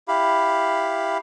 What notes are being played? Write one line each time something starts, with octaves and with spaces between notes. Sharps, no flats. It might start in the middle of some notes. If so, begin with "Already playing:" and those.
E4 G4 F5 B5